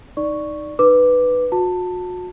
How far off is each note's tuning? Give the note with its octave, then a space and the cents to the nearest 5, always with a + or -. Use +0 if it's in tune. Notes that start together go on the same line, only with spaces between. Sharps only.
D#4 -5 D5 +0 C#6 +0
D#4 -30 B4 +5 D6 +0
F#4 -40 A5 +20